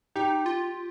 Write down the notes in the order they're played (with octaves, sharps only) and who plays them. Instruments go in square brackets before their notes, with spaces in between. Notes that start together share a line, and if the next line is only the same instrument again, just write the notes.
[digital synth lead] D#4 [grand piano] G4
[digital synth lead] F4